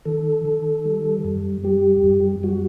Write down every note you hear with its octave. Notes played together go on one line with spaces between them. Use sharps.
D#3 A4
D#3
G3
F#2
G3 G4
F#2
G3 F#4